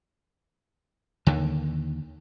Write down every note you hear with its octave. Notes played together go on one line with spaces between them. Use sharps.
D#2 D3 D#3